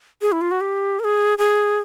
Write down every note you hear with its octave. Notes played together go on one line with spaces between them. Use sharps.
G#4
E4
F4
F#4
G4
A#4
G#4
G#4